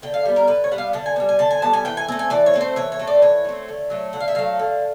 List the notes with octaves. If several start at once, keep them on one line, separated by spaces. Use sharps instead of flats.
D3 G5
F5
G3 B3
A#4
D3 B4
C#5
G3 B3 F#5
F5
D3 A5
G#5
B3 G#5
G3
G#5
D3 A5
G#5
G3 B3 A5
G#5
E3 G5
G#5
A3 C4 G#5
G#5
E3 D5
C#5
A3 C4
C5
E3 C#5
C#5
A3 C4
D5
E3 C#5
A3 C4
D3
F#3 A3
D3 F#5
F5
E5
F#3 A3 F5
D3